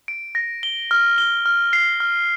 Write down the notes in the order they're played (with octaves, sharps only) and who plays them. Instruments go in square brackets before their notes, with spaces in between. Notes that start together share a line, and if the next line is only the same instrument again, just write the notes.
[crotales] D7
A#6
G7
F6
G7
F6
C7
F6